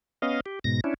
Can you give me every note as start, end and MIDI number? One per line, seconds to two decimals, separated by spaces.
0.22 0.40 59
0.22 0.40 61
0.22 0.40 75
0.22 0.40 77
0.46 0.59 67
0.64 0.80 44
0.64 0.80 47
0.64 0.80 94
0.84 0.94 61
0.84 0.94 62
0.84 0.94 64